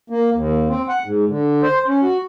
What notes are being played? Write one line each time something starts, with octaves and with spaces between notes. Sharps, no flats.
A#3
D#2
C4
F#5
G#2
D3
C5
C#4
F#4